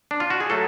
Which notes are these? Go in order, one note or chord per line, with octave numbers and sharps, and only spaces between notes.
D4
F4
F#4
G#4
F#3 A3 A4